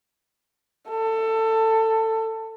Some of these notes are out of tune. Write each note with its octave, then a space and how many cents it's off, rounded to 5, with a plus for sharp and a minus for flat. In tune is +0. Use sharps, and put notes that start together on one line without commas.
A4 +20